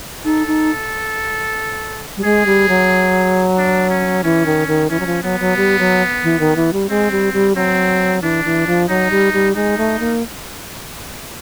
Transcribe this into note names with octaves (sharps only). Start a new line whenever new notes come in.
D#4 A4
D#4
G3
G#3 G#4
G3
F#3
D4
C#4
E3 C#4
D#3
D#3
E3 C#4
F#3
F3
F#3 B3
F#3
G3
F#3
E3
D#3
E3
G3
G#3 C4
G3
G3
F#3 C4
E3 D4
E3
F3
F#3 D#4
G3
G3
G#3 D#4
A3
A#3